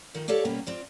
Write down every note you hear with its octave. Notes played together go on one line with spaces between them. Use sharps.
D#3 D#4 F4
G4 A4 C#5 D5 F5
B2 G3 A#3 B3 C#4
C4 F4 D5